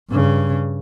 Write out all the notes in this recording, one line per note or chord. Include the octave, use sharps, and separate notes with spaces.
G2 C#3